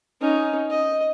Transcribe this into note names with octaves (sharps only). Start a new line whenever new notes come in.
C#4 D#4
D#5